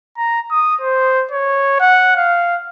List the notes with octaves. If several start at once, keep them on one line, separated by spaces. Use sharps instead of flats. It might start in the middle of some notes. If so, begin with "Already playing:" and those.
A#5
D#6
C5
C#5
F#5
F5